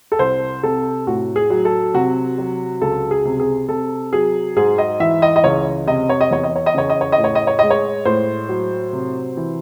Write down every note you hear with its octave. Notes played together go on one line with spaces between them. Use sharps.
A4
C2 C5
C3 A4
A2 F#4
G#4
F#3
A4
C3 F#4
F#3
C#2 A4
G#4
C3
G#4
C3 A4
F#3 G#4
G#2 G#4
D#5
E3 E5
D#5
D#5
C#2 C#5
C3 D#5
C#5
D#5
E2 C#5
D#5
C#5
D#5
C#3 C#5
D#5
C#5
D#5
A2
C#5
D#5
C#5
G#3 D#5
C#5
A2 C5
F#3
C3
E3